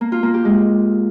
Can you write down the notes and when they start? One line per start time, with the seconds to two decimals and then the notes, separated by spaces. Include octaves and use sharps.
0.01 A#3
0.12 F4
0.23 A#3
0.34 G4
0.45 G#3